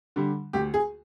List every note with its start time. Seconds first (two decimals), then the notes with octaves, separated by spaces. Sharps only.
0.16 D3 G3
0.53 D2 G4
0.74 G#4